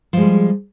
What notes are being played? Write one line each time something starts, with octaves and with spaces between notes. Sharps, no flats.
F3 G3 G#3